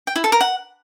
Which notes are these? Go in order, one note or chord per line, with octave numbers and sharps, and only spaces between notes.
G5
E4
A4
A#4
F#5